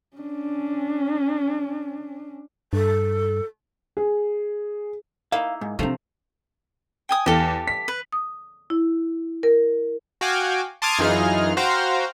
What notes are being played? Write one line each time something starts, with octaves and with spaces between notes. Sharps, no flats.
C#4 D4
G2 A4
G#4
A#3 D#4 E4 F5
G#2
C3 F3 A3 C4 D4 A#5
G5 G#5 D#6
E2 G4 A4 F5
B6
B4
D#6
E4
A#4
F#4 F5 G5 G#5 D6
A5 C6 D6 D#6 F6 G#6
F#2 E3 D#4 F4 G#4 F6
F#4 C5 F5 G5 A#5